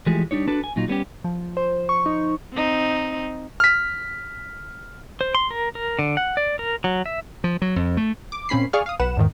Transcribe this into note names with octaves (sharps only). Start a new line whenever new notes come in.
E3 F3 G#3 A3 G4 G#4
G3 D4 D#4 C#5
D4 F#4 A4 B4 A5
G#5
A#2 F#3 D#4 F4
G3 B3 C#4 G4
F3
C5
C#6
D#4
C4 D#4
F6 B6
C5
C6
A#4
A#4
D3
F#5
D5
A#4
F#3
E5
F3
F#3
F2
A3
D6
A#2 C4 C#4 B5 C7
G#4 D5 F5 C#6 F6
F5 D#6
B1 B4 F#5 E7
E2 G#2 D#3